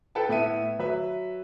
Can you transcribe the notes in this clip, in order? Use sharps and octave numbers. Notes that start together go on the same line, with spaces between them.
A4 B4 G5 A5
A2 B3 E4 E5 D#7
F#3 B4 E5